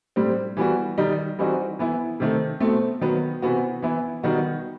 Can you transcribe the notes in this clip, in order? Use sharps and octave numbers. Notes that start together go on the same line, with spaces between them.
A2 G3 C4
E3 G3 B3 F#4
D#3 G3 D#4
E3 G3 C4 D#4 F#4
E3 B3 E4
C3 D#3 A3
B2 A3 C4
D#3 F#3 B3
C3 E3 B3 F#4
E3 B3 E4
D#3 G3 B3 D#4 F#4